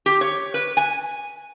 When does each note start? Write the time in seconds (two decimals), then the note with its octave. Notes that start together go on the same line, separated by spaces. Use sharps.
0.06 G4
0.21 C#5
0.54 B4
0.77 G#5